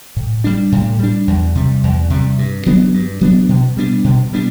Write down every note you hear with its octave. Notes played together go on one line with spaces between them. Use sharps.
A2
G3 D4
A2
G3 D4
E2
C3 G3
E2
C3 G3
G2
F#3 B3 D4
G2
F#3 B3 D4
B2
G3 B3 D4
B2
G3 B3 D4